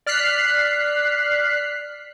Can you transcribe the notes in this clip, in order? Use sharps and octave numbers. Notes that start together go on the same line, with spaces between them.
D5 F6 F#6 B6 C7